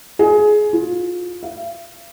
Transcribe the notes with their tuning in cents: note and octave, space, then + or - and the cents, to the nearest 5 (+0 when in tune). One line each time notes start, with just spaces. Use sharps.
G#4 +20
F4 +25
F5 -45